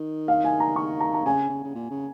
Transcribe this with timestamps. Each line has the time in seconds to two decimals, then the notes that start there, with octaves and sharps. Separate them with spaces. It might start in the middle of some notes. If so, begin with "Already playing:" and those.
Already playing: D#3
0.28 F5
0.44 G#5
0.60 A#5
0.76 D#3 C#6
1.00 A#5
1.14 A#5
1.26 C#3 G#5
1.49 C#3
1.64 C#3
1.75 A#2
1.90 C#3